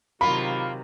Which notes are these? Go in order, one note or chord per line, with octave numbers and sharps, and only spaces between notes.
C3 D#3 F#3 A#3 F4 B5